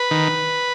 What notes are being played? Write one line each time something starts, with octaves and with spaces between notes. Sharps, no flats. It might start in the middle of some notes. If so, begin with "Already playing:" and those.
Already playing: B4
D#3